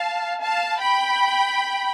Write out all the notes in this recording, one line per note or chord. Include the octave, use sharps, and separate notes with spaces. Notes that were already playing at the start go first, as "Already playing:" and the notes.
Already playing: F5 A5
F5 A5
G5 B5